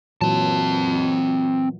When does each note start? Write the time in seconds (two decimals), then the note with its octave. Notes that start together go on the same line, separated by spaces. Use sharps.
0.21 A#2 E3 F#3 C4 A5